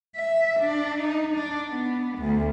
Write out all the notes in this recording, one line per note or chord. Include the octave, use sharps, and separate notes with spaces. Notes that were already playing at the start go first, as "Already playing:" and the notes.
E5
D4
D#4
D4
B3
D2